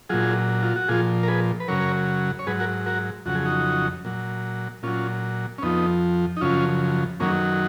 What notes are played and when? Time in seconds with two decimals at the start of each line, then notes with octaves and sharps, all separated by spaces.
0.10 A#2 F#3 F4 G#4
0.63 F4
0.76 F#4
0.88 A#2 F3 F4 G#4
1.23 A#4
1.28 G#4 B4
1.60 B4
1.68 F#2 C#3 F#3 A#4 C#5
2.39 C#5
2.47 G#2 F#3 G#4 B4
2.60 F#4 A#4
2.86 F#4 A#4
3.25 F2 C#3 F#3 F#4
3.35 G#4
3.45 D#4 F#4
4.05 A#2 F#3
4.83 A#2 F#3 C#4 F4
5.58 C#4
5.62 F2 F3 B3 D#4
6.37 D#4
6.41 F#2 C#3 F3 C#4 F4
7.20 F#2 D#3 F#3 A#3 C#4